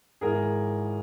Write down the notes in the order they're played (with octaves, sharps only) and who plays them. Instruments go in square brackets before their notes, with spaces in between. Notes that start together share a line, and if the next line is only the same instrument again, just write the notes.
[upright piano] G#1 G#2 E3 G#4 A#4